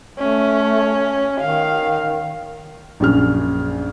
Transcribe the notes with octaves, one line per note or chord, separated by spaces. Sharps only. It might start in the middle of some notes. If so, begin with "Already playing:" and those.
A3 C#4
D#3 F5
A#1 F#2 G#4 F6